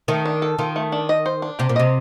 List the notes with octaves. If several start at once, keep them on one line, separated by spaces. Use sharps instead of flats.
D#3 A3
D4
A4
D#3 F4
A3
D4
D#5
C5
D4
C3 G4
A#2
C3 D#5